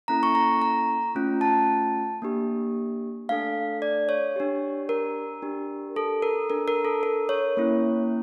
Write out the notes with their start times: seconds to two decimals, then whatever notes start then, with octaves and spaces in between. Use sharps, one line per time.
0.08 A#3 C#4 E4 A4 A#5
0.23 C#6
0.35 A#5
0.62 A#5
1.15 A3 C#4 F4
1.41 A5
2.22 A#3 D4 G4
3.29 A3 D4 A4 F5
3.82 D5
4.09 C#5
4.36 D4 G4
4.89 A#4
5.42 D4 G4
5.96 A4
6.22 A#4
6.50 D4 A4 A#4
6.68 A#4
6.85 A4
7.03 A#4
7.29 C#5
7.57 A#3 C#4 E4